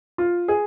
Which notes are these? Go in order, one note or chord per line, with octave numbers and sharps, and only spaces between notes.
F4
G#4